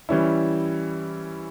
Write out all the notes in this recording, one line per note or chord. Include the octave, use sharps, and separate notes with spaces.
E3 G3 C#4 E4